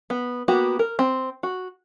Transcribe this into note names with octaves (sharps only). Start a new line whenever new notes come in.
B3
A#3 B3 F#4 G4
A#4
C4
F#4